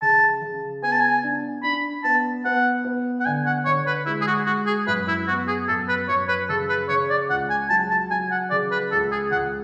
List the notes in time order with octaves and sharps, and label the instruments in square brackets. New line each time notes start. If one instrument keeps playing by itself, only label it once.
[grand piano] C#3 [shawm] A5
[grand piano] C#3
[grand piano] B3 [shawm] G#5
[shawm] A5
G#5
[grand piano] D4
[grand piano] D4 [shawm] B5
[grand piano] B3 [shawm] A5
[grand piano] B3 [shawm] F#5
[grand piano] B3
[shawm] F#5
[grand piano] D3 [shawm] G#5
[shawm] F#5
[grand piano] D3 [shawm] C#5
[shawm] B4
[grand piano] G#3 [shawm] E4
[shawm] G#4
F#4
[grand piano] G#3 [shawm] F#4
[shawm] G#4
[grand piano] F#2 [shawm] B4
[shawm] E4
[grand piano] B3 [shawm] F#4
[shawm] G#4
[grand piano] F#2 [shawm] A4
[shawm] B4
[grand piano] F#2 [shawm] C#5
[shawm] B4
[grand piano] C#3 [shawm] A4
[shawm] B4
[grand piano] C#3 [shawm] C#5
[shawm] D5
[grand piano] C#2 [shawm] F#5
[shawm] G#5
[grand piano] F#3 [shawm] A5
[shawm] A5
[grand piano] F#3 [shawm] G#5
[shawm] F#5
[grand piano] C#3 [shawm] D5
[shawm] B4
[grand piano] C#2 [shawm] A4
[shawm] G#4
[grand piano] C#2 [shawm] F#5